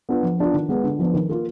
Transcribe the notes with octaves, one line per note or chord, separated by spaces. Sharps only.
B3 D4 F4
F3
B3 D4 F4
D#3
G#3 B3
D3
F3 B3 D4
D#3
A#3 F4